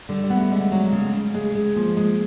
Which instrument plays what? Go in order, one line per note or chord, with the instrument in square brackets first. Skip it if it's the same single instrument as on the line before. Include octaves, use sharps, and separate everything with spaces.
[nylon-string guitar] D3 [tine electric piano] G3
[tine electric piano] G3
[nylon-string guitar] B3
[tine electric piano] A3
[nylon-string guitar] D3 [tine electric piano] G#3
[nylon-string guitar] F#3
C#3
C#3
[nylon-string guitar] G#3 [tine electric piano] A3
[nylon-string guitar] G#3
[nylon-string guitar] F3 [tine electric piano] A#3
[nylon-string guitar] G#3